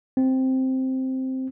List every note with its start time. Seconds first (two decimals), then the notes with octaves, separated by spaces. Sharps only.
0.17 C4